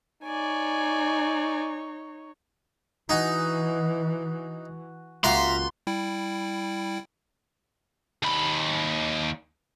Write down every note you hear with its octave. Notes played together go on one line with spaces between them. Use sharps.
D#4 C#5 D5 G#5
E3 D#4 F#4 G#5
C#2 A#3 F4 F#4 E5 F5 A#5 C6
G3 E4 G5
D#2 B5